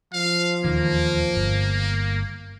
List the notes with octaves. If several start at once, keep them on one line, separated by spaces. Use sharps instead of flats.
F3 F5
D#1 E2 D#3 A#3
G1